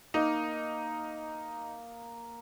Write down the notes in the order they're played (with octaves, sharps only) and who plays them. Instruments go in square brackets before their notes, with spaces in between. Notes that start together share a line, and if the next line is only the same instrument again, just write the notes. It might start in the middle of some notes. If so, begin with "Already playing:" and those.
[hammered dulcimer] A#3 [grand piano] D#4